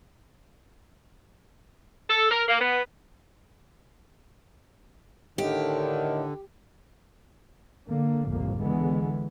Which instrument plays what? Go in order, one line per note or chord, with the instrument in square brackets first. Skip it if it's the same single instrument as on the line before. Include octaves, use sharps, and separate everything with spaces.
[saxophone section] A4
A#4
A#3
B3
[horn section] A2 D#3 [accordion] D3 [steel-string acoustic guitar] G4
[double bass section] D3 A#3
G1 C2 F2 A2 A#3
C#2 D3 E3 G#3 B3